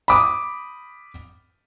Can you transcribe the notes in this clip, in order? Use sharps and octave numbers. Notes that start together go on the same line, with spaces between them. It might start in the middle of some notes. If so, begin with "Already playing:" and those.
B5 D6 D#6